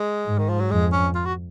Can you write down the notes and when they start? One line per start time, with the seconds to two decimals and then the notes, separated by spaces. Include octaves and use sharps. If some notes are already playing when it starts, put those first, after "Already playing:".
Already playing: G#3
0.26 G#2
0.38 D#3
0.49 F3
0.60 F#3
0.70 F2 G#3
0.92 C#4
1.15 F4
1.25 F#4